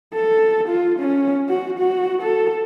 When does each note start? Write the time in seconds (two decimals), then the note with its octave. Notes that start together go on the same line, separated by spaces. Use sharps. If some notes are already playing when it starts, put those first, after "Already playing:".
0.14 A4
0.68 F4
0.99 C#4
1.49 F#4
1.78 F#4
2.22 A4